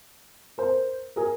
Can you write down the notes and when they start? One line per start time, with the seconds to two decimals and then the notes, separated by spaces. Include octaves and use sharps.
0.58 A#4 C5
1.16 G#4 A#4